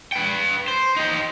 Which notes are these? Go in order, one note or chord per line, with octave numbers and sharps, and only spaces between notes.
B4 G5
C5
D#4 G4